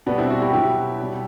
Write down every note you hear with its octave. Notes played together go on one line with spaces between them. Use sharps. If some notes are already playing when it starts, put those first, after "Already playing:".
B2 G3 B3 D4
C4 E4
D4 F#4
E4 G4
B2 F#3 E4 G4
B2 G3